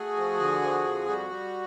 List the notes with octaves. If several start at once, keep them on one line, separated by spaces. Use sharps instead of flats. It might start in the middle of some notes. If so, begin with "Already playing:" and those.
Already playing: A3 F#4 G#4
F3
D3
F3
F2
G3 F#4
G3